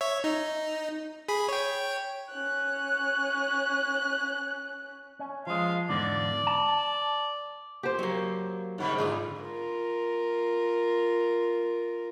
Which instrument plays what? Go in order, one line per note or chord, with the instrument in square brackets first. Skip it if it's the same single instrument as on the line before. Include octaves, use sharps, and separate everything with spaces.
[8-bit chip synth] C#5 E5
D#4
G#4 B5
C#5 G5
[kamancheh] C#4 F#6
[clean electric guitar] C#4
[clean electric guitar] F3 G#3 [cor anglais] F5
[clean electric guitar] E2 G#2 D3 [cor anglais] D5
[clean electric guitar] A5
[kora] G4 C5
[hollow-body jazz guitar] F#3 A#3
[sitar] G#2 C#3 G3
[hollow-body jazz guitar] G#2 D3 F4 [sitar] G#4
[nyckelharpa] F4 A#4